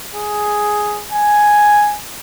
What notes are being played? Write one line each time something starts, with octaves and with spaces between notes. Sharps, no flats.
G#4
G#5